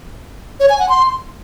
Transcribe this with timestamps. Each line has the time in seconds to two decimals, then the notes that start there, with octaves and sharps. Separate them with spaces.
0.60 C#5
0.70 G#5
0.79 F#5
0.89 C6